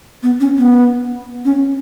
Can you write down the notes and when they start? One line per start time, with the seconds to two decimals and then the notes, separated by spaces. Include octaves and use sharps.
0.23 B3
0.40 C#4
0.57 B3
1.45 C#4